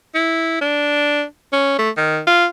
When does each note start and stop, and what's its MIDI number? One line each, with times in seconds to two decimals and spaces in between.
0.15 0.58 64
0.61 1.24 62
1.53 1.78 61
1.79 1.90 57
1.97 2.20 51
2.27 2.46 65